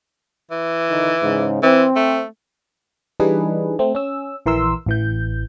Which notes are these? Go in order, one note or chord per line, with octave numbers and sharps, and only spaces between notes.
E3
D3 D#3
G#2 C#3
E3 C4
A3
E3 G3 D4 D#4 G#4 B4
A3 C4
C#4 E6
A#1 E3 A#4 C6 E6
A1 E3 G6